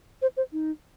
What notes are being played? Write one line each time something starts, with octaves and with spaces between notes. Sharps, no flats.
C5
C5
D#4